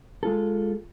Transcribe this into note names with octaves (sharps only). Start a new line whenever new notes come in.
G#3 F4 A4